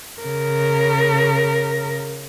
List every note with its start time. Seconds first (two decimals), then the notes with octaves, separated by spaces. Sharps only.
0.22 C#3 A#4